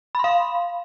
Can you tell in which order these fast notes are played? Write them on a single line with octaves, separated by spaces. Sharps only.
B5 C6 F5